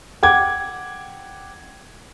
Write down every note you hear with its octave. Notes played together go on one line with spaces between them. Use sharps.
F#5 G5 D6 G#6